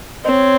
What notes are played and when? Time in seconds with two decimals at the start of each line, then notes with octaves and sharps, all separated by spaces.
0.24 C4 C#5 D#5